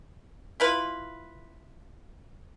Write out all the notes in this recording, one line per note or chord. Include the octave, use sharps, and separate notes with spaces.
E4 F4 B4